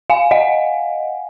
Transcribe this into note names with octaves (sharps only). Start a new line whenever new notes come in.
F5 G#5
D#5 F#5